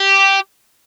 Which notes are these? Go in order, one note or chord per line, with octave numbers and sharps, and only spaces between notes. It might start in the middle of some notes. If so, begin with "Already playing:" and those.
Already playing: G4